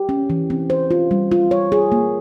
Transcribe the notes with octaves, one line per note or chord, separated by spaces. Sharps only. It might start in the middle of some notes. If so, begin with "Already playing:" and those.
Already playing: G4
C#4
E3
C4
C5
F4
G3
F4
C#5
G#4
A#3